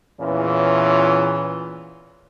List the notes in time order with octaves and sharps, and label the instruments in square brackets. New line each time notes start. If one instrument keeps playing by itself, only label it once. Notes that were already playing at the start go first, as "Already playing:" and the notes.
[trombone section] E2 A#2 E3 C#4 F4